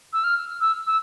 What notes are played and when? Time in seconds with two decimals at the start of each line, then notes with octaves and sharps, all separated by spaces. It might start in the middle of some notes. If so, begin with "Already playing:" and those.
0.13 E6
0.24 F6
0.61 E6
0.87 E6